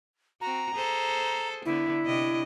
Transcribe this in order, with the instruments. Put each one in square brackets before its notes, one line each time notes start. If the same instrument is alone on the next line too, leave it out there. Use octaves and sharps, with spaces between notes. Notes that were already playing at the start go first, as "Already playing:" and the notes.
[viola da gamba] C4 F#4 [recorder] A#5
[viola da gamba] G#4 A4 C5
[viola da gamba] D3 B3 [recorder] E4
[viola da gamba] C3 D4 D#5